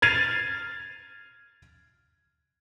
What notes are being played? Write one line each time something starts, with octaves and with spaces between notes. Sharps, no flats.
F6 G#6 A6 C7 D#7 F7